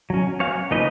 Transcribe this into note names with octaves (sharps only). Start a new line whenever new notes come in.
F#3 C#4
F#3 C#4 C#5 F5
C#3 F3 A#3 D#4 B4 D#5